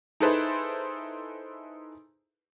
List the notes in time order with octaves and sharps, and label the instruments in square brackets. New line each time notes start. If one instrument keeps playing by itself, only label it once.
[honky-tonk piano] D#4 E4 G#4 A4 B4 C5